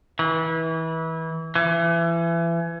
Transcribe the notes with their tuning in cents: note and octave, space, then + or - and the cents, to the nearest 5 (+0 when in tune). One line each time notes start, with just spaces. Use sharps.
E3 -25
E3 +30